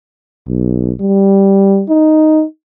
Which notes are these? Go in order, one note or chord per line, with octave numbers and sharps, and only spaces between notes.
B1
G3
D#4